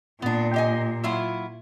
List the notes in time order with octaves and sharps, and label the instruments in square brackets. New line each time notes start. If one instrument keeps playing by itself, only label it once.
[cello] A#2 [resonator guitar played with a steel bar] B3 D4
[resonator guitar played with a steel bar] G4 D#5 G#5
F#3 E4 F4